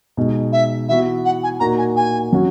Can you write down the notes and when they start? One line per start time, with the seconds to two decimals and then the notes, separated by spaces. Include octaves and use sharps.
0.17 B2 G#3 D#4
0.52 E5
0.88 E3 B3 F#4 E5
1.25 F#5
1.43 G#5
1.60 A#2 A#3 D#4 F#4 A#5
1.78 G#5
1.96 G#5
2.33 F#3 C#4 F#4